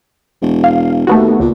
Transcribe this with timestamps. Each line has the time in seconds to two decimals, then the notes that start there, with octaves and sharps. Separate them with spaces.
0.42 E1
0.64 F5
1.07 D#2 A3 B3 F#4
1.40 C#2 A#2